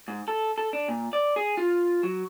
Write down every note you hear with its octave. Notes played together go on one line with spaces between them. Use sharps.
G#2
A4
A4
D4
A#2
D5
G#4
F4
F#3